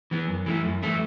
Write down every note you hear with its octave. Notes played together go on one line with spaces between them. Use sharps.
E3 B3
F#2
E3 A3 E4
F#2
E3 A3 E4